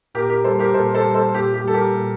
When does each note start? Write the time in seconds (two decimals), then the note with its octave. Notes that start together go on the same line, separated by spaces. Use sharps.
0.14 A#2 G4 A#4
0.29 G4 A#4
0.44 G3 A4 C5
0.59 G4 A#4
0.74 A#2 A4 C5
0.94 A4 C5
1.04 G3
1.14 A4 C5
1.34 A#2 G4
1.54 G4
1.64 G3 A4
1.74 G4 A#4
1.95 A#2